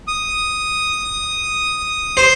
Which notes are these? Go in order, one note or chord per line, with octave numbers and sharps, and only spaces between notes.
D#6
C5